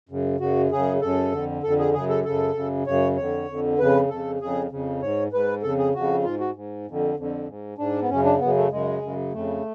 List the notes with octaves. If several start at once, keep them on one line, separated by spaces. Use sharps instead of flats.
F#2 C#3
F#2 C#3 F#4
F#2 C#3 G#4
F#2 C#3 A4
F2 D3
F2 D3 A4
G#4
F#2 C#3 G#4
A4
F#2 C#3 A4
F#2 C#3
F#2 C#3 C#5
F2 D3 C#5
F2 D3
F2 C#3 B4
F2 C#3 A4
F2 C#3 G#4
F2 C#3
G#2 C#5
G#2 B4
F2 C#3 A4
G#4
F2 C#3 F#4
G#2 F4
F#4
G#2
F2 D3
F2 D3
G#2
G#2 D4
B3
F#2 C#3 C#4
D4
F#2 C#3 B3
A3
F#2 C#3 G#3
F#2 C#3
F2 C#3 A3